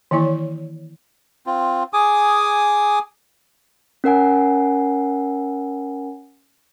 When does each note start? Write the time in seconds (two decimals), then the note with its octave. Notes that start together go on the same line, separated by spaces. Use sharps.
0.11 D#3 E3 A#3 E4 C#5
1.46 C4 F4
1.93 G#4 G#5 D6 D#6
4.04 C#4 A#4 F#5 G#5